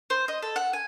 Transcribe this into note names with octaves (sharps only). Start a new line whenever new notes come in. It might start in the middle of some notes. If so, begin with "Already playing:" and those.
C5
D#5
A4
F#5
G#5